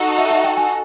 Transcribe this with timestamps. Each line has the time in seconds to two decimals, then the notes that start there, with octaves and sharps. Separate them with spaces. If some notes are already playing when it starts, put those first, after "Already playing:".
Already playing: D#4 F#4 A4
0.18 E5
0.30 E5
0.44 G5
0.57 G#5